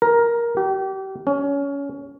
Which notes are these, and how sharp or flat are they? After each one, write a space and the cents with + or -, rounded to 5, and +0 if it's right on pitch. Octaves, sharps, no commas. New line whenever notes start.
A#4 +10
G4 -30
C#4 +20